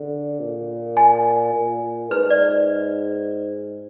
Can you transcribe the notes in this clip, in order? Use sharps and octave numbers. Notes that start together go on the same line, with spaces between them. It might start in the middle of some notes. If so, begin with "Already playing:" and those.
Already playing: D3
A#2
G#5
A#2
G#2 B4
D5